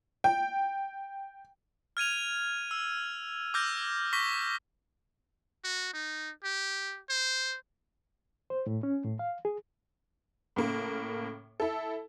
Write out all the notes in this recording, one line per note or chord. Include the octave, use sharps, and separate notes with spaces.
G5
F6 G#6 D#7 F7
E6
D6 E6 F6 G6 A#6
C#6 D6 A#6 B6 G7
F#4
D#4
G4
C5
C5
A2
C#4
A2
F5
G#4
A2 C#3 A#3
E4 A4